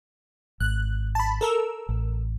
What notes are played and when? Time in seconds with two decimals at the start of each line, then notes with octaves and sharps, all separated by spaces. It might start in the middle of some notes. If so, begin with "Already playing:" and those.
0.60 G#1 F#6
1.15 A5 B5
1.41 A4 A#4 E6
1.89 A1